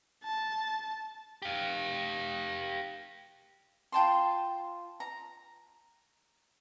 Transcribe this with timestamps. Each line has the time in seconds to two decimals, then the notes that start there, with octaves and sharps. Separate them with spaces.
0.24 A5
1.42 G4 F5
3.92 F4 G5 A5 C6
5.00 A#5